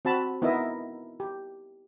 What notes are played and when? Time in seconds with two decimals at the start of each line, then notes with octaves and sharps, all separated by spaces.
0.05 C4 F#4 A5 B5
0.42 B3 D#4 E4 A#4 D#5 E5
1.20 G4